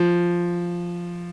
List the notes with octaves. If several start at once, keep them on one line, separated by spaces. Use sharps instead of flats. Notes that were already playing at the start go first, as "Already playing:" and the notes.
Already playing: F3